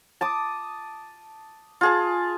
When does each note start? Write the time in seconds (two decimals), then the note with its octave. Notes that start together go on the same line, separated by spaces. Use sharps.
0.21 A5 D6 D#6
1.81 F4 G#4 A5